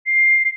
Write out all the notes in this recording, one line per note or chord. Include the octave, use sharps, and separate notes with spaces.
C7